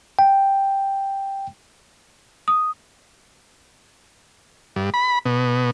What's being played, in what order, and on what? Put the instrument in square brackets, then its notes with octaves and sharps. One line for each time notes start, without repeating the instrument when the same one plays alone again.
[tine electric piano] G5
[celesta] D#6
[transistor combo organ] G2
B5
B2